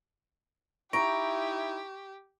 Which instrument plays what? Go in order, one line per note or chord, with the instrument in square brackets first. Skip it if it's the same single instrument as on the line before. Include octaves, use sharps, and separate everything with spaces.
[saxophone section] D#4 E4 [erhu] G4 [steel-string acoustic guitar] A#5 [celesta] C#6 A#6 D7